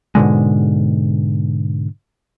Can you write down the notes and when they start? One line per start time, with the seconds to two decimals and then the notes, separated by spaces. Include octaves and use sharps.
0.15 G#2 B2 D3 G#3